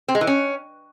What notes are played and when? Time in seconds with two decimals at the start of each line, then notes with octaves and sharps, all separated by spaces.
0.08 C4
0.15 G#3
0.21 E3
0.27 C#4